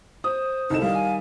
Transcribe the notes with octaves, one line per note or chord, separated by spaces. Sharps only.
C5 D#6
C2 D#4 A4 E7
D#3 G3 F5
G#5